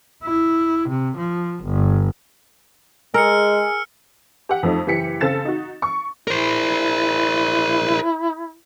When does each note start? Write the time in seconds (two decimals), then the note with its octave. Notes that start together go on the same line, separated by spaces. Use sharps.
0.24 E4
0.89 C3
1.17 F3
1.64 G1
3.14 G#3 G#4 A#4 E6 F6 C#7
4.49 G4 F#5
4.63 F2 F3 A3 D#4
4.86 F#1 E3 G4 B6 C#7
5.21 C#3 C4 A4 A6 E7
5.45 D#4 F#4
5.82 C#6
6.28 E4 A#4 C5